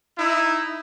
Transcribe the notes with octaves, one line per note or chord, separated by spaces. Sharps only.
D#4 E4